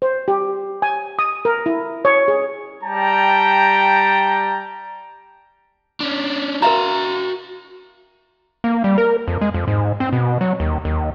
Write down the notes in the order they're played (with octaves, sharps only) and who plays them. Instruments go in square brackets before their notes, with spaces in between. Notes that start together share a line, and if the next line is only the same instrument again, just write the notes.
[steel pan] C5
G4
G#5
D#6
A#4
E4
C#5
G#4
[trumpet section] G3 G5 A5 A#5
[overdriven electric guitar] C#4 D4
[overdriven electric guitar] F#4 F5 [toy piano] A#4 E5 A#5
[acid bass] A#3
G3
A#4
F2
G#3
F2
G#2
C4
B2
F#3
D#2
D#2